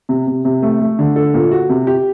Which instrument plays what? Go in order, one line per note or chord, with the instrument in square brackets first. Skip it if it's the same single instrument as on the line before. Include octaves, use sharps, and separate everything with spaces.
[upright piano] C3
C3
C3
A3
A3
D3
A4
A#2
F#4
C3
G4